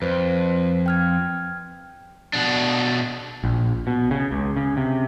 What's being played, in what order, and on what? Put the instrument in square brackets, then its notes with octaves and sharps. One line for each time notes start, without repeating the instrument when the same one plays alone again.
[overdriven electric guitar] F2 [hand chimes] B4 C5
[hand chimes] G5 F6 G#6
[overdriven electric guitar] B2 D4
[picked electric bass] A#1
B2
C#3
C#2
C#3
C3